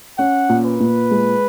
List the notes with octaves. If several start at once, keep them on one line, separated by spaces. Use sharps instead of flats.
C#4 F#5
A#2
B4
A#2
G#3